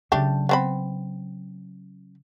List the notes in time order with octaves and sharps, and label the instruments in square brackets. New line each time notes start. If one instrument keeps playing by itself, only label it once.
[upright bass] C#3 F#3 [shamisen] A3 D4 G4
[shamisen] B3 C4 B5